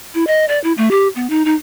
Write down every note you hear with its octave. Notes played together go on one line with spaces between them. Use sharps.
E4
D#5
D5
E4
A3
G4
B3
D#4
D#4